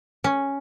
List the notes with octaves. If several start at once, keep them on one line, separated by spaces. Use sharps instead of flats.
C#4